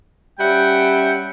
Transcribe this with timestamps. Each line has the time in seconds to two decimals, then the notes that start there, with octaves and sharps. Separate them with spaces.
0.40 G3 C#4 E5 F#5 G5